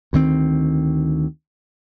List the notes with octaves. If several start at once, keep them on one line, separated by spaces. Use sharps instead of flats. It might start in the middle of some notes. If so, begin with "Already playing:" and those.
D2 D#3 C4